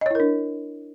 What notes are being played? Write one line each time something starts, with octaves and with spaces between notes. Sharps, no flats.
D4 E4 A#4 C#5 D#5